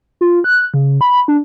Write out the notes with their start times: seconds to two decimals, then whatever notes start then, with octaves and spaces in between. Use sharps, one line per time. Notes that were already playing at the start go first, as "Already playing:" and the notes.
0.21 F4
0.44 F#6
0.74 C#3
1.01 B5
1.28 D4